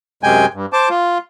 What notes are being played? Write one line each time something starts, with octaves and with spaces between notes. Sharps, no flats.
F#2 C3 G#3 G5 G#5
G2
C5 A5 D6
F4